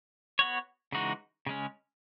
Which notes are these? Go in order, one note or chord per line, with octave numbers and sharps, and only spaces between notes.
B3 F#4 C#5
C#3 E3 G#3 D#4 F#4
C#3 G#3 C#4